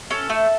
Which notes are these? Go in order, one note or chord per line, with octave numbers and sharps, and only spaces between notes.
C#4 A4
A3